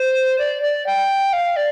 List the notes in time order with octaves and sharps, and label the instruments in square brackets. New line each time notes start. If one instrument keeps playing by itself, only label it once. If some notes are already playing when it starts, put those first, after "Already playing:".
Already playing: [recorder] C5
D5
D5
G5
F5
D5